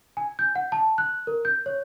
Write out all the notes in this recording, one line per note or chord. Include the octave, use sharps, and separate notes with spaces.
G#5
G6
F#5
A5
F#6
A#4
G6
C#5